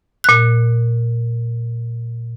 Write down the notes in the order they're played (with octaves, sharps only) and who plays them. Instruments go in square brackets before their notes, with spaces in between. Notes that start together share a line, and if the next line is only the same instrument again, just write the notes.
[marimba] A#2 F#6